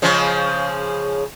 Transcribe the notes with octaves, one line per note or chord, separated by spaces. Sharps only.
C#3 F3 G#3